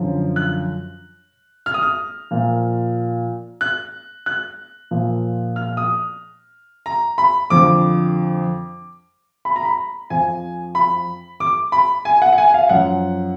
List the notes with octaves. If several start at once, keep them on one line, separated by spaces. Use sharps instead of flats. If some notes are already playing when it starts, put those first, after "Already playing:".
Already playing: F#2 D3 F3
F#6
F6
D#6
F6
A#2 F3
F#6
F#6
A#2 F3
F6
D#6
A#5
B5
F2 D3 F3 D6
B5
A#5
B5
F2 F3 G#5
B5
D6
B5
G#5
F#5
F#5
G#5
F5
F#2 F3 F#5